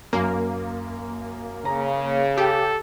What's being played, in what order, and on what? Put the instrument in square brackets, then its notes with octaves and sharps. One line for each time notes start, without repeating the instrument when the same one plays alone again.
[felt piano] F#2 [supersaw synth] A#3
[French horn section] C#3 [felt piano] A#5
[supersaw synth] G4 [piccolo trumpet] A4